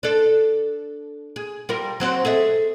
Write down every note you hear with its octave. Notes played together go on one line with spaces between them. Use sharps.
D4 A4
G#4
G3 F4 A#4
F#3 C4 F#4
G#4 A4 E5